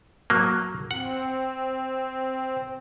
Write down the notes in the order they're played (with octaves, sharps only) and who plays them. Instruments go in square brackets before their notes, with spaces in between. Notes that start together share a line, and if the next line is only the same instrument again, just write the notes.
[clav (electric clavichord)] F#3 A#3
[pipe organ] C4 [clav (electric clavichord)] F#5